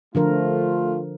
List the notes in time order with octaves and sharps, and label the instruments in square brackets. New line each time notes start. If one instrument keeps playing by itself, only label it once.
[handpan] D3 F3 A#4 [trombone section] A3 F4